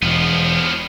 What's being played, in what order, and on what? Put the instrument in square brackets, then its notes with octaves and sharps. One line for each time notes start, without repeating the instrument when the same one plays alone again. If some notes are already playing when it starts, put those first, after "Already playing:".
[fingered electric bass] E1 [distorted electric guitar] F3 B3